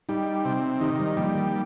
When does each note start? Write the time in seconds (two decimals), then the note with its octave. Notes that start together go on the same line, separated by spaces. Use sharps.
0.09 G3 D#4 G4
0.45 C3
0.81 D#3 D#4 G4
1.00 G3
1.17 F3 G3 A#3
1.35 D#3